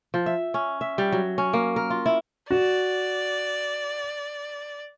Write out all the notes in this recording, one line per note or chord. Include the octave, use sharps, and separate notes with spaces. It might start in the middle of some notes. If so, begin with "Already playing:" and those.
F3
E5
C#4
E5
G3
F#3
C#4
A#3
A#4
F4
E4
F#4 D5